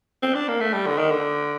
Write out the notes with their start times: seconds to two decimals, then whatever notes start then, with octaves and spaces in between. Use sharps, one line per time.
0.22 C4
0.35 D4
0.48 A#3
0.61 A3
0.73 G3
0.86 D3
0.98 D#3
1.11 D3